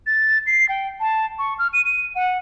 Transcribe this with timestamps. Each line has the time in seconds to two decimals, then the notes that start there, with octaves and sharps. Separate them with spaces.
0.07 A6
0.47 C7
0.69 G5
1.00 A5
1.39 C#6
1.59 F6
1.73 D#7
1.85 D#7
2.15 F#5